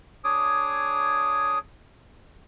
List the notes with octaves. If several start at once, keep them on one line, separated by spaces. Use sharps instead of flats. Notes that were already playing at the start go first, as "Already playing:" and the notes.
D4 G#4 C#5 D6 D#6